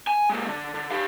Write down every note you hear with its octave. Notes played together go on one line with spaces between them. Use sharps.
G#5
G#3 A#3
D3
D3
G4 F5